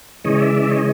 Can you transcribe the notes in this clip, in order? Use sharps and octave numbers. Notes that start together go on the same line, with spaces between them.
C#3 E3 G#3 C#5 D#5
D5 E5
D5 E5
C#5 D#5